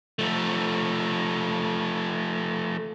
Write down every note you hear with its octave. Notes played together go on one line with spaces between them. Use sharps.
F3 A3